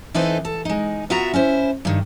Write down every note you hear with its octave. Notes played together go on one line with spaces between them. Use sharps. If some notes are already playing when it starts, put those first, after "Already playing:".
E3 C4 D#4 A4 B4 C5
A4
G#3 D#4
B3 F4 F#4 E5 F#5 A#5
C#4 E4 C5
G2 D#3